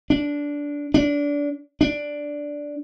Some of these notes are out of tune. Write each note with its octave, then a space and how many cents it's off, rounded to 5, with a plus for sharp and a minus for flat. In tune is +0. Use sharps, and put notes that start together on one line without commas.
D4 -15
D4 -25
D4 -5